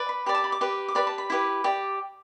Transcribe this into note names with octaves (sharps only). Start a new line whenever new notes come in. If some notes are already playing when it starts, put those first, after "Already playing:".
Already playing: B4 D5
B5
G4 D5 B5
A5
B5
D6
G4 B4 D5
D6
G4 B4 D5 B5
A5
B5
E4 G4 B4
G4 D5